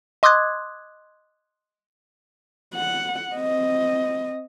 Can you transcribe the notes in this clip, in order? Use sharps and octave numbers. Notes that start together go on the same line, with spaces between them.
D#5 C6 D6 D#6 F#6 G#6
F#5
C4 D#5